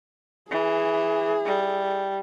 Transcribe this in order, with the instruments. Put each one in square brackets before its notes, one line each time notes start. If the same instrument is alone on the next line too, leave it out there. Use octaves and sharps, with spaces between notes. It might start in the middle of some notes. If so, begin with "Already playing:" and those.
[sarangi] E3 [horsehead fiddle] G#4
[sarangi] G3